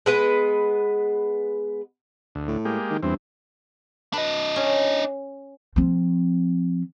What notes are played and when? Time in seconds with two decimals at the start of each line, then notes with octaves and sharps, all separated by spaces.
0.06 G#3 B3 B4
2.35 D2
2.48 A2
2.65 G#3 A#3 G4
2.90 D#3
3.03 E2 G2 C4
4.13 D4 B4 D#5
4.56 C#4
5.76 F3 C4